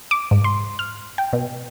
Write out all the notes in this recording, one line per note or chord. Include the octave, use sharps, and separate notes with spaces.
D6
G#2
C6
F6
G5
B2